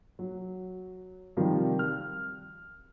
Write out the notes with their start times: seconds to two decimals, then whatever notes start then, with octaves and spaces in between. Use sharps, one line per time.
0.19 F#3
1.37 C3 D#3 F3 G3
1.79 F6